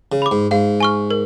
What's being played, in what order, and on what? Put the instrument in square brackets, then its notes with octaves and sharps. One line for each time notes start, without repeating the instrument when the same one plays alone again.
[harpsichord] C#3
[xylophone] B5 D6
[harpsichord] G#2
[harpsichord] G#2 [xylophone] F5
[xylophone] G#5 C#6 F6
A#4